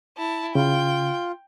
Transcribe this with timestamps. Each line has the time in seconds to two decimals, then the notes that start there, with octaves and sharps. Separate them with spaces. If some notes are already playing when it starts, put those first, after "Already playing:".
0.17 E4 A5
0.55 C#3 F4 G5